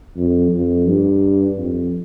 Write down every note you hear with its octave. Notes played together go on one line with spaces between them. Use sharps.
F2
F2
G2
F2